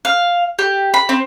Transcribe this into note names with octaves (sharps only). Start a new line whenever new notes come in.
F5
G4
B5
C4